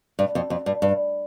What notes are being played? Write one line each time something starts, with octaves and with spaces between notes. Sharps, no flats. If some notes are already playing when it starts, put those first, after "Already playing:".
G2
F2
F2
G2
G2